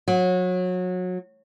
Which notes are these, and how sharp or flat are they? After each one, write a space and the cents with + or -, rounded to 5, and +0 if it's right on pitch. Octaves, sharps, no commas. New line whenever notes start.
F#3 -25